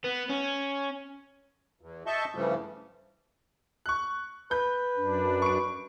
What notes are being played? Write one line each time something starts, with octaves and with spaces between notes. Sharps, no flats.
B3
C#4
E2
D#5 E5 A5 C#6 G6
G2 C#3 E3 F3 G3 A3
C#6 F#6
B4 G6
F#2 D4
C#6 D7